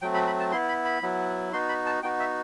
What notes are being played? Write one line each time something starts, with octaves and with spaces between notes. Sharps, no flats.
F#3 A3 C4 G5
B5
B5
A5
B3 E4 C6
B5
B5
F#3 B3 E4
B3 D#4 F#4 C6
B5
A5
B3 D#4 F#4 G5
E5